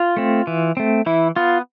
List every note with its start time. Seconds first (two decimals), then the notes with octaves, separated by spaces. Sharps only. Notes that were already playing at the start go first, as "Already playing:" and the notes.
Already playing: F4
0.17 A3 C4
0.47 E3
0.77 A3 C4
1.06 E3 E4
1.36 B3 F4